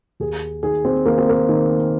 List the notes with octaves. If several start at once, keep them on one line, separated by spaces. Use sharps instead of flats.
D#2 G#4
D#3 G#4
C4
D#3 A#3
C4
A#3
D#3